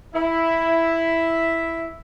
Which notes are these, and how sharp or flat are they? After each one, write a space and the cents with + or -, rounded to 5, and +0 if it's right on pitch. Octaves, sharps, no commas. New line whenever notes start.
E4 +0 E5 +0